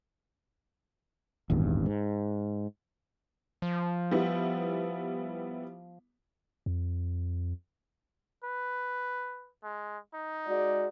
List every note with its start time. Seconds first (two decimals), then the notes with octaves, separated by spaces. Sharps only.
1.50 D#1 G#1 E2 G2
1.86 G#2
3.62 F3
4.12 G3 B3 E4
6.66 F2
8.43 B4
9.63 G#3
10.14 D#4
10.47 G#3 F#4 D5